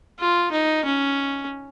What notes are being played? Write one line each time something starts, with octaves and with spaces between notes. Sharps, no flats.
F4
D#4
C#4